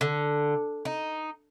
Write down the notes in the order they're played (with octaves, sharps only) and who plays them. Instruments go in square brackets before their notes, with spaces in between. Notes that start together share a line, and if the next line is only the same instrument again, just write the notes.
[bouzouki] D3
D#4